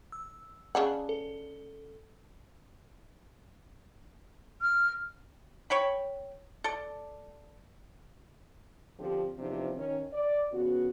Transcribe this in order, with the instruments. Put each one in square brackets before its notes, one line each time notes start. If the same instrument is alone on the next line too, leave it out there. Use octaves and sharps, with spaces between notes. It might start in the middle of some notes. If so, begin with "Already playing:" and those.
[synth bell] E6
[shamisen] C#3 D4 F#5
[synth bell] A4
[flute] F6
[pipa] C#5 G5 B5
A4 D5
[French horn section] D3 F3 C4 G4
E2 C3 F3 C4 D4 D#4
D#3 C#4
D5
F2 C#3 B3 F#4